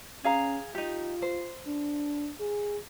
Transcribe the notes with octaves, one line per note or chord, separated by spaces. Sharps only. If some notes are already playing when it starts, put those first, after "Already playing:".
C#4 G#4 F5 A#5
D#4 F4 G4
C5
D4
G#4